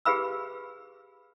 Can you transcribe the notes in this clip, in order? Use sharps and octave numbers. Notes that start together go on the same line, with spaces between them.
G4 G#4 B4 F5 B5 E6